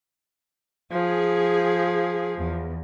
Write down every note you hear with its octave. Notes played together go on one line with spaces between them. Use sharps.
F3 G#4
E2